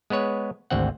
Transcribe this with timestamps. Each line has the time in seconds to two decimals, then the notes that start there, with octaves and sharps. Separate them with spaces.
0.10 G#3 B3 B4 C#5
0.71 G#1 D2 C4 F#5